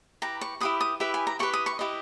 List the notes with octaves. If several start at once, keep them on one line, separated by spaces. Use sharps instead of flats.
E4 G4 B4 A#5
C#6
E4 G4 B4 D#6
D#6
E4 G4 B4 E5
G#5
A#5
E4 G4 B4 C#6
D#6
C#6
E4 G4 B4 D#5